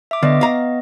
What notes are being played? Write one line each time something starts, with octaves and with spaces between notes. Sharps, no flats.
E5 D6
D3 B3 D#5
F5 A#5